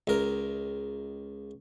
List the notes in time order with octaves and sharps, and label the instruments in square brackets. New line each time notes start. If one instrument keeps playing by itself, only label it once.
[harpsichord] C#2 A#4